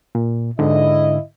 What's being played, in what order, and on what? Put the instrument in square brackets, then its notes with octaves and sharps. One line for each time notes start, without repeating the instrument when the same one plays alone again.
[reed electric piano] A#2
[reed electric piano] G#2 D3 [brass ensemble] E4 D#5